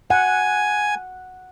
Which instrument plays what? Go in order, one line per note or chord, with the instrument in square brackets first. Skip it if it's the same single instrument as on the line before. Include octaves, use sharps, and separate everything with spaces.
[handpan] F#5 [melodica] G#5